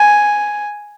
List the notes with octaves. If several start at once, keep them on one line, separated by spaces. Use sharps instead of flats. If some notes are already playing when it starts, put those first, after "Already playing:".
Already playing: G#5